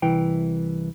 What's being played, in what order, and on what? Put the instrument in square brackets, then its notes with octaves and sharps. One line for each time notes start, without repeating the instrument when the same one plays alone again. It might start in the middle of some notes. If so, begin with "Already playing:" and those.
[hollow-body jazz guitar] C2 E3 G5